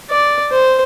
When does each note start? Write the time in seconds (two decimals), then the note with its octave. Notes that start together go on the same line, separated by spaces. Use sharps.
0.10 D5
0.52 C5